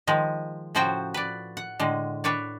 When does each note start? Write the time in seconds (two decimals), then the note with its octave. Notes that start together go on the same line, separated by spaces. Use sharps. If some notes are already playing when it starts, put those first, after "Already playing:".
0.07 D#3 F3 G#3
0.75 A2 C#3 F3 F#4 C5 G5
1.14 B4 D5
1.57 F#5
1.80 A2 D3 G#3
2.24 D4 B4 C#5 D5